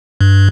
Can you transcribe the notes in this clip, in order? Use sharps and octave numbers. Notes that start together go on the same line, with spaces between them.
G2